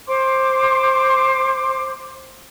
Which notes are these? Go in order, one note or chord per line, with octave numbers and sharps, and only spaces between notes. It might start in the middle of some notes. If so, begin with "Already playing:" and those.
C5 C6 D6